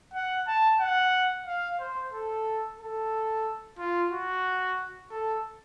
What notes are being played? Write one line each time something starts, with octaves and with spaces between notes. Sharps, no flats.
F#5
A5
F#5
F5
C5
A4
A4
F4
F#4
A4